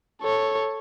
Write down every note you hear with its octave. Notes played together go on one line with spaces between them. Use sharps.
A4 C#5